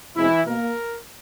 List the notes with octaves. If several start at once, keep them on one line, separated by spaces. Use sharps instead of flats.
E2 B2 E3 G#3 C4 E4
B2 A#3 A#4